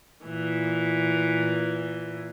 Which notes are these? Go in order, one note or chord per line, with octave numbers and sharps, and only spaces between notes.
A#2 E3